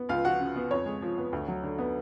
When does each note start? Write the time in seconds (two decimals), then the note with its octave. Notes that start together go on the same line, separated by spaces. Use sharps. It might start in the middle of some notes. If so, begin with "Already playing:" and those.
Already playing: B3
0.09 C#2 F4 F5
0.25 F3 F#4 F#5
0.40 C#3
0.56 B3
0.71 F2 C#5
0.86 G#3
1.02 F3
1.18 B3
1.33 D2
1.48 F#3
1.63 D3
1.78 B3